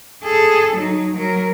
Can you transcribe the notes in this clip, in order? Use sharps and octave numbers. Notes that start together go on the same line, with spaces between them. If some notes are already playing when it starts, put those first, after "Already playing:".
G#4 A4
F#3 D#4
F#3 A#4